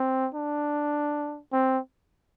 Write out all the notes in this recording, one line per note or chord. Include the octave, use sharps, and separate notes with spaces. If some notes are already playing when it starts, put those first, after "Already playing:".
Already playing: C4
D4
C4